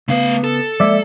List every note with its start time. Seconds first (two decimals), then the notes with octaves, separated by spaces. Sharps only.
0.08 C#3 A3 B3 F5
0.44 A4
0.80 F3 G#3 A#3 D5 E5